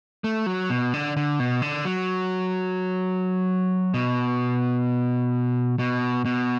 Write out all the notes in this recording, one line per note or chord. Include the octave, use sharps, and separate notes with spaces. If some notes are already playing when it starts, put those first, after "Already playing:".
A3
F#3
B2
D3
D3
B2
D3
F#3
B2
B2
B2